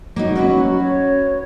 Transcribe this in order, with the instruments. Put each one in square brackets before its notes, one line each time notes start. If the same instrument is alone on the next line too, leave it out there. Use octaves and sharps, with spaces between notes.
[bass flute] F#3 [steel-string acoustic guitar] A#3 B3 D#4
[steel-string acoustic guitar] C#4 F#4 B4
[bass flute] C#5